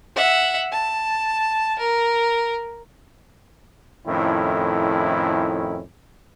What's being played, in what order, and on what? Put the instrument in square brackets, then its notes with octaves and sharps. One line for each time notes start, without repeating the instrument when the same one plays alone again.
[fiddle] E5 F#5
A5
A#4
[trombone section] F2 A2 D#3 C#4 E4